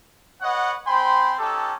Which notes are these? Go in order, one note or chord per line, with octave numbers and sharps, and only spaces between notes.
B4 C#5 D#5 F#5
C4 C5 G5 G#5 B5 C6
C#4 D#4 G4 A4